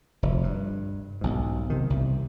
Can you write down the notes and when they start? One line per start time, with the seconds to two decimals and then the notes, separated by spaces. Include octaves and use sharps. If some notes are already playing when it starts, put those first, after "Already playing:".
0.23 F1 D2
0.43 G2
1.21 B1 G#2
1.70 C3 D#3
1.90 C2